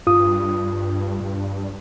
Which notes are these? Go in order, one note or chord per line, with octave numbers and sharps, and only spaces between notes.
G2 F4 D#6